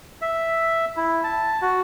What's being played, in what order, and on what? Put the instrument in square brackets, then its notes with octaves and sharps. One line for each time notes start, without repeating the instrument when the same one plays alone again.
[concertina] E5
E4
A5
F#4